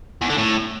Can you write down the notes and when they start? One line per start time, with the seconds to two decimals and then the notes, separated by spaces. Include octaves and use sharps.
0.21 E2
0.29 D3
0.38 A2